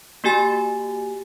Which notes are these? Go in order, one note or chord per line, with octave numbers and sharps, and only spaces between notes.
A#3 F#4 G4 G#5 A6